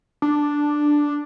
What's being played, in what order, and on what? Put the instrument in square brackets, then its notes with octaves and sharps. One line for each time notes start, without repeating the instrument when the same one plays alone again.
[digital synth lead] D4